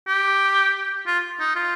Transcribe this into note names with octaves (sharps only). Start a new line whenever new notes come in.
G4
F4
D#4
F4